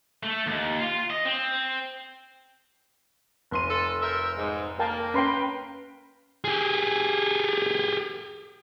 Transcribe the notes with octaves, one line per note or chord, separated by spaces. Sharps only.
A3
D#2
F4
D#5
C4
F1 C6 D#7
A4
A#4 C5 E5
G#2
A#3 A#4 G5 A5
C#4 B4 G5 A#5 C6
G4 G#4